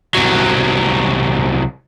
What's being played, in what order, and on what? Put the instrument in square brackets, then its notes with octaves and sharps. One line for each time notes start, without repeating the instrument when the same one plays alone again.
[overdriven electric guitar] C2 F#3